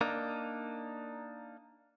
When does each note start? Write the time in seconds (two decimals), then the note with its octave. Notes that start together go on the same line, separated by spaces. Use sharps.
0.01 A#3 D4 D#4